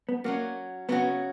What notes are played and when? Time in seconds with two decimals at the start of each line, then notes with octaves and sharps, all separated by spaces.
0.09 B3
0.24 F#3 A#3 C#4 F#4
0.89 C#3 F#3 B3 C#4 F#4